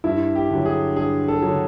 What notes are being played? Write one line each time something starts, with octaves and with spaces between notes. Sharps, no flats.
G2 E4
G4
D3 F#3
G#4
G2 G#4
A4
D3 F#3